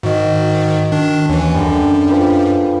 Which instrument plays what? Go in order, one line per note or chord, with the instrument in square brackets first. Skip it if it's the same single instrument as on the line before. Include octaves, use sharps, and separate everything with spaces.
[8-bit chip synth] G#2 D#3 [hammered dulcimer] F#4 D#5
[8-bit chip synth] D#3 D4
[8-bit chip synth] D#2 E3 [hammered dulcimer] C#4 F#5
[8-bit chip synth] F#2 [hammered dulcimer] D3 G3
[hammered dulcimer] F3 B4 D6